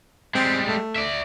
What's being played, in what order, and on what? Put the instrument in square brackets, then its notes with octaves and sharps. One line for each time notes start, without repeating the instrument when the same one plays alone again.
[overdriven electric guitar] G3 G#3 [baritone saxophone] C4
[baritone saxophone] A3
[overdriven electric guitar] D5 E5